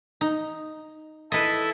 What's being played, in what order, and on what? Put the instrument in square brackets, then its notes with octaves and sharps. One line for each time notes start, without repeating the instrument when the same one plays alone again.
[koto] D#4
[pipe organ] E4 A4 [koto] B4 D#5